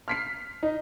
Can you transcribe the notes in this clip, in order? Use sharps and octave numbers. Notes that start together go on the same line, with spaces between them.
F6 B6 C7
D#4